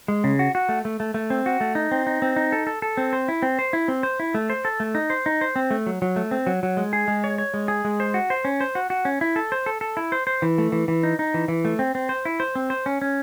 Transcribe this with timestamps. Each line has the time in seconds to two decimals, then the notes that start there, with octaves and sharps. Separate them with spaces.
0.08 G#3
0.24 C#3
0.39 F#4
0.55 F#4
0.69 A3
0.85 A3
1.00 A3
1.14 A3
1.30 C4
1.46 F#4
1.61 A3
1.75 D#4
1.91 C4
2.07 D#4
2.22 C4
2.36 D#4
2.52 A4
2.67 A4
2.82 A4
2.97 C4
3.13 C5
3.28 E4
3.42 C4
3.59 C5
3.73 E4
3.88 C4
4.03 C5
4.20 E4
4.35 A3
4.50 C5
4.65 A4
4.80 A3
4.95 D#4
5.10 C5
5.26 D#4
5.41 C5
5.56 C4
5.71 A3
5.87 F#3
6.02 F#3
6.16 A3
6.31 C4
6.47 F#3
6.63 F#3
6.77 G#3
6.93 G#4
7.08 G#3
7.24 C#5
7.38 C#5
7.54 G#3
7.68 G#4
7.85 G#3
8.00 C5
8.14 F#4
8.30 C5
8.45 C#4
8.61 C5
8.75 F#4
8.90 F#4
9.05 C#4
9.21 E4
9.36 A4
9.52 C5
9.66 A4
9.81 A4
9.97 E4
10.12 C5
10.27 C5
10.42 E3
10.58 A3
10.72 E3
10.88 E3
11.03 D#4
11.19 D#4
11.34 E3
11.48 E3
11.65 A3
11.79 C4
11.95 C4
12.09 C5
12.25 E4
12.40 C5
12.55 C4
12.70 C5
12.86 C#4
13.02 C#4